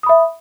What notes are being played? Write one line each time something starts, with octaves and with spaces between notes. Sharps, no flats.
E5 B5 D#6